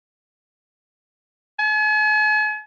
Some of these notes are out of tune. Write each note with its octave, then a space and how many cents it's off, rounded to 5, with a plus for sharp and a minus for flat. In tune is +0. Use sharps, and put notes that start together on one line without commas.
G#5 +45